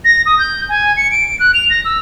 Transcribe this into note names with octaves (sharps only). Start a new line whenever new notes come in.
A#6
D#6
G6
G#5
C#7
D7
F#6
F7
A#6
E6